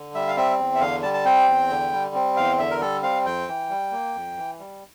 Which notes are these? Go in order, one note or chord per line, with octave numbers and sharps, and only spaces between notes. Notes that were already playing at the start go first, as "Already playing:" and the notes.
Already playing: D3
G3 E5
F5
C4 E5
E2
E5
D3 F5
G3 A5
A5
C4 G5
E2
D3
G3
C4
E2 F5
D3 E5
A#4
G3 A4
C4 F5
F2 G5
E3
G3
A#3
F2
E3
G3